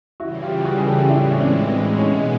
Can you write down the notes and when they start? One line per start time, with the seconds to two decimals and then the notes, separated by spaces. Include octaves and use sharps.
0.20 C#3 E3 G3 E4 F#4
0.42 F4 G4
0.65 F#4 G#4
0.78 G#4
0.87 G4 A4
1.01 F4
1.09 A2 E3 G#3 D4 E4
1.30 C#4
1.38 C4 D4
1.68 C4
1.98 B2 G#3 B3 C#4 D#4